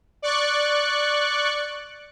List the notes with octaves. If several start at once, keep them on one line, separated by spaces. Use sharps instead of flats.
D5 C#6 F#6